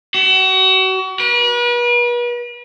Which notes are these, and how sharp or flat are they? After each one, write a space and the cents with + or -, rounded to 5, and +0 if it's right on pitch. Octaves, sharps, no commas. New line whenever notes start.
F#4 +35
B4 -40